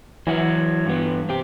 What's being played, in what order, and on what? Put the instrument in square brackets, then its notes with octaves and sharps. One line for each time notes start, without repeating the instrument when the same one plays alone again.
[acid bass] E3 [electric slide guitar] F#3 E4 F#5
[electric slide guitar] G2 B3
C4 G4